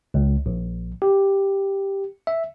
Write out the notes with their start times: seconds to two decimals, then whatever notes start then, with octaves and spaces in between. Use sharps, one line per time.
0.14 C#2
0.46 A#1
1.02 G4
2.27 E5